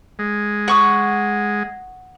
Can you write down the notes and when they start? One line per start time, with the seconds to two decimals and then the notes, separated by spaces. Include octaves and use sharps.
0.19 G#3
0.68 F#5 C#6 D#6